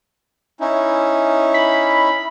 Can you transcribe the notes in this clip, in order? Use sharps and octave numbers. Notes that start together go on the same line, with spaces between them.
C#4 D#4 E4
B5